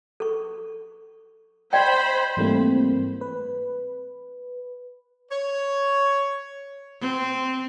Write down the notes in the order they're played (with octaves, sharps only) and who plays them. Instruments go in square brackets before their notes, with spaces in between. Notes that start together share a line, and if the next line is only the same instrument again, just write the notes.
[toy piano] A4 C#6
[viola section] C5 B5 [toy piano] D5 D#5 G5
[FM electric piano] G#2 E3 G3 A3 A#3 C4
B4
[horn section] C#5
[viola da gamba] C4